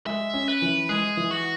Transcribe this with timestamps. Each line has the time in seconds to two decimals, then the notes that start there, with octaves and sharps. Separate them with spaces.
0.06 G#3 E5
0.34 C#4
0.48 B4
0.62 E3
0.89 G#3 G#4
1.17 E3
1.31 F#4